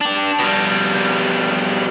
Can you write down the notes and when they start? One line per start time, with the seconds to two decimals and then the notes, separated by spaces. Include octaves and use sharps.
0.01 D4 G4
0.39 B2 G3